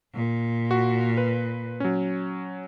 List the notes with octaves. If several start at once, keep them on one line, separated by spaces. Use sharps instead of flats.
A#2
F#4
B4
F#3 C#4